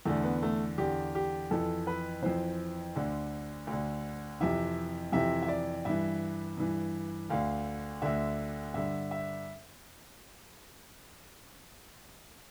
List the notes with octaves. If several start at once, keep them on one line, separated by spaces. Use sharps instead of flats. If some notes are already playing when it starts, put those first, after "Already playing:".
E2 D3 A3
B3
A3
E2 D3 G4
G4
F2 E3 A4
B4
F2 E3 C5
D2 D3
D2
D3
F2 C3 E3 E5
F2 C3 E3 E5
E5
D5
G2 E3 E5
G2 E3
D2 D3 F5
D2 D3 E5
G2 D3 E5
E5